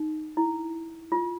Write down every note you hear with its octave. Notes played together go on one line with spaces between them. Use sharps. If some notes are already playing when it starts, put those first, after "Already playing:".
Already playing: D#4
E4
F4